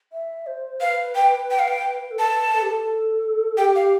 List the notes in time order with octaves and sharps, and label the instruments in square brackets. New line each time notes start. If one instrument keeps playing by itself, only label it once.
[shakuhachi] E5
C5
[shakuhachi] B4 [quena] F5
[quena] G5
G5
F5
G5
[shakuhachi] A4
[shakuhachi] B4 [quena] A5
[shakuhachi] A4
G4
A4
[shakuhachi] G4 [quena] G5
[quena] F5